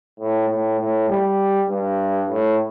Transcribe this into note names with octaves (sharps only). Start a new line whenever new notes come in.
A2
A2
A2
G3
G2
A2